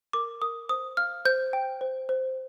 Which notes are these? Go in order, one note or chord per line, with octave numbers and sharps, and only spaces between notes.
A#4 D6
A#4 D#6
C5 D#6
F5 F6
C5 G6
G5
C5
C5